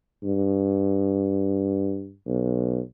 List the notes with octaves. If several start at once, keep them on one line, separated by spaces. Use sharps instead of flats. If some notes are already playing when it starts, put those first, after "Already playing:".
G2
B1